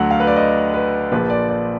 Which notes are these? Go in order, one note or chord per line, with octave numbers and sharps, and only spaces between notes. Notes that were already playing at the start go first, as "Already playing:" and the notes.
Already playing: D2 D3 F#3 F#5
F5
B4
D5
D#5
B4
A#1 A#2 F3 B4
D5
D5